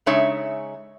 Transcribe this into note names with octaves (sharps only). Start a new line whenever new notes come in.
C#3 G#3 D#4 C#5 E5